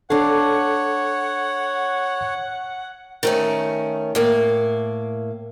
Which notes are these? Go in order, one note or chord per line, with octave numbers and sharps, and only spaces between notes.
D4 A4 C#5 F5 F#5
D#3 A3 C#4
A2 A#3